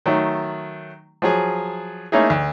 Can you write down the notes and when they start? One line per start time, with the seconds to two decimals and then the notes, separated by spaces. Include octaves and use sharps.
0.06 D#3 F#3 A3
1.22 F3 F#3 G#4
2.12 A3 A#3 C#4 D#4 E4 G#4
2.30 D2